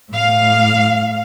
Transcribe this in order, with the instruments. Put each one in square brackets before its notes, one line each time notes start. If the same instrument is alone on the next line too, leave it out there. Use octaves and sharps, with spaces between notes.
[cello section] A2 F5